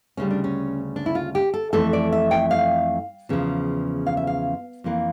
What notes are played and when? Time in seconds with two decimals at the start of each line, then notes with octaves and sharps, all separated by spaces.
0.17 D2 C#3 G3 C#4
0.30 D4
0.44 C#4
0.96 D4
1.06 E4
1.15 F4
1.35 G4
1.54 A4
1.73 F2 E3 A3 A4
1.93 D5
2.12 E5
2.31 G5
2.51 F5
3.29 E2 C#3 F3
4.07 F5
4.17 E5
4.27 F5
4.84 F2 E3 A#3